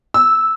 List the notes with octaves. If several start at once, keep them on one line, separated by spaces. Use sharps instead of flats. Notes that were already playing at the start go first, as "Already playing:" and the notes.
E6